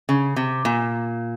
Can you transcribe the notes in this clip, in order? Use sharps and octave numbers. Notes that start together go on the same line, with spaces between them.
C#3
C3
A#2